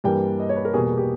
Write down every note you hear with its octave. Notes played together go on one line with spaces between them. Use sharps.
G2 E3 G3 A#3 G5
D#5
C#5
B4
A#4
E2 B2 G3 A#3 G#4
G#4
G4